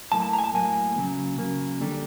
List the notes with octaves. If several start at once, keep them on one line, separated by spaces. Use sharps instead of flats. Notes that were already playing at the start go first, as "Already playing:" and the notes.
A2 F#3 A#3 A5
A5
A#5
G#5
A5
A2 F#3 A#3 G#5
C#3 F#3 A#3
C#3 F#3 A#3
D3 G3 A#3